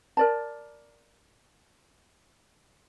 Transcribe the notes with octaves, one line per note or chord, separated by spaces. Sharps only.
A#4 D5 A5